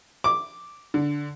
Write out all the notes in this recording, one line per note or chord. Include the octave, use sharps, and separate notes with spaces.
D6
D3